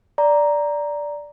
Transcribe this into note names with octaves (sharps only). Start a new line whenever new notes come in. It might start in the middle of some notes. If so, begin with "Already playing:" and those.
D5 A#5